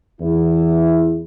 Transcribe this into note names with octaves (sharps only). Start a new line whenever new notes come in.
E2 E4